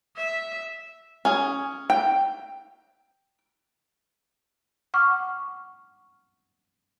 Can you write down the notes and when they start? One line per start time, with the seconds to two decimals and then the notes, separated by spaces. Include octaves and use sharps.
0.17 E5
1.25 C#4 G#4
1.90 G5
4.94 F#5 C#6 D6 F6